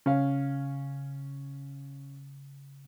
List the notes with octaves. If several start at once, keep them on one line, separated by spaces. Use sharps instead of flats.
C#3 C#4 F5